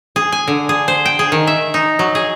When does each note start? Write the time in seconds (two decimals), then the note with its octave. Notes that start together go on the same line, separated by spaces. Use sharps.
0.16 G#4
0.32 G#5
0.48 D3
0.69 G#4
0.88 C5
1.05 G5
1.19 G#4
1.32 D#3
1.47 E5
1.74 D#4
1.99 F#3
2.15 G#4